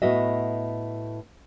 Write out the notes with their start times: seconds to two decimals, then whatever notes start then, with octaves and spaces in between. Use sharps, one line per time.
0.02 A2 B3 F#4 D#5 E5